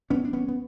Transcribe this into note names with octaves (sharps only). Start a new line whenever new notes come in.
A1 B3 C#4
D4
B3 C#4
B3